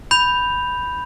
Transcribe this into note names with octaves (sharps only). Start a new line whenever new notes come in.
B5 G6 F7